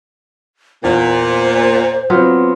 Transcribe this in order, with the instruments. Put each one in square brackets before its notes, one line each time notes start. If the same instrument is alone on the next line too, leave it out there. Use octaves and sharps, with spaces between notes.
[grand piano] E2 [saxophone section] A#2 [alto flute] C5
[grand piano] F#3 C4 [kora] B3 F4